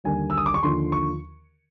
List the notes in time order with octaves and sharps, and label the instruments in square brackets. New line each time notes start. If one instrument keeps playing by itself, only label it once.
[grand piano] D#2 D3 G3 A#3 G#5
E6
D#6
D6
C#6
D#2 D3 F3 C6
C#6